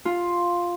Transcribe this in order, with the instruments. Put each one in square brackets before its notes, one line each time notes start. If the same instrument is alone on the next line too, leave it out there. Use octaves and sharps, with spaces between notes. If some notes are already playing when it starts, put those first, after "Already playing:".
[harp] F4